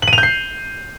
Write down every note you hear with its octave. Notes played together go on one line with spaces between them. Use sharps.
F#7
D#7
F7
G6
C7